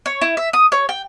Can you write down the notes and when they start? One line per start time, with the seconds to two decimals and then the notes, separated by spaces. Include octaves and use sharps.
0.06 C#5
0.21 E4
0.37 E5
0.53 D#6
0.72 C#5
0.89 G5